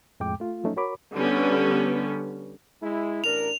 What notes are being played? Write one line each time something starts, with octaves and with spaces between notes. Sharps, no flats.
F2 A2 G#3 G5 D6
A3 F4
F3 F#3 A3 C#4 D#4
F#4 A#4 C#5 B5 D6
D3 G3 B3 C#4
G#3 E4
A1 D4 A#4 F7